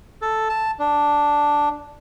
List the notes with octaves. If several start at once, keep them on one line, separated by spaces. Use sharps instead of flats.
A4
A5
D4